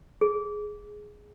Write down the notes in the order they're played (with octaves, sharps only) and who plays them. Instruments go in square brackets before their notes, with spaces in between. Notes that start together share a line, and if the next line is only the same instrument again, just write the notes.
[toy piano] G#4